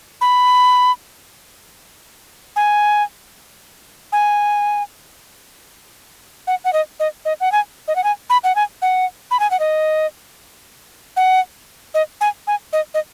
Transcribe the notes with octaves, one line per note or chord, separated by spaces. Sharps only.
B5
G#5
G#5
F#5
F#5
D#5
D#5
D#5
F#5
G#5
D#5
F#5
G#5
B5
F#5
G#5
F#5
B5
G#5
F#5
D#5
F#5
D#5
G#5
G#5
D#5
D#5